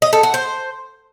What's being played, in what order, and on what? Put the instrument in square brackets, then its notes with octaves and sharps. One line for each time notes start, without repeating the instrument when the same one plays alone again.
[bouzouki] D#5
A4
F#4
C5